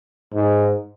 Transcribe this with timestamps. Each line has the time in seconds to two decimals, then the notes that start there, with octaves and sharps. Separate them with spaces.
0.34 G#2